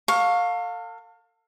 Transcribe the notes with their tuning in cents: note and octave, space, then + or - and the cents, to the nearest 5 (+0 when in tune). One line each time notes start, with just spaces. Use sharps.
A4 +45 F5 +20 C#6 +0